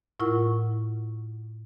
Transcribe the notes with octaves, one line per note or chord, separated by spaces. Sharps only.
A2 E4 F4 A#4 F#5 C#6